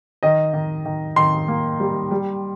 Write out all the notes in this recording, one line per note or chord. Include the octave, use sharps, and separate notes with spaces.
D#3 D#5
D#3
D#3
D#3 C6
A#3
G3
G3